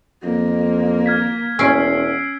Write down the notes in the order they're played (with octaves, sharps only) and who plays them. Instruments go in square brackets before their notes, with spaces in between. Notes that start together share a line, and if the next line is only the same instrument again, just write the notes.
[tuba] F2 [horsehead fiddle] A#3
[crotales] F6 G#6 B6
[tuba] E1 [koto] C#4 [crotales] E6 C7 D7